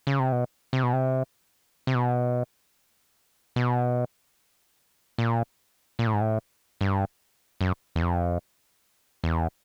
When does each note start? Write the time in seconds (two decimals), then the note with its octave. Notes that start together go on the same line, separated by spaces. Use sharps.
0.07 C#3
0.19 C3
0.32 B2
0.73 C3
0.83 B2
0.93 C3
1.87 C3
1.95 B2
3.56 B2
5.18 A#2
5.99 A#2
6.07 A2
6.14 G#2
6.21 A2
6.81 G2
7.61 F#2
7.96 E2
8.02 F2
9.24 E2